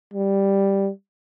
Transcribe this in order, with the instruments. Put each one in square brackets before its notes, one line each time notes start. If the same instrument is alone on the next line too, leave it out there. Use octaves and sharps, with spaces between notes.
[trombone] G3